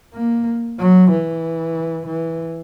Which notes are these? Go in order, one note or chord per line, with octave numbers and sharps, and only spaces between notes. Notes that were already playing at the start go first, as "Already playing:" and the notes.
A#3
F#3
E3
E3